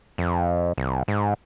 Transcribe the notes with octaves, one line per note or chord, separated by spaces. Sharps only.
F2
C2
G#2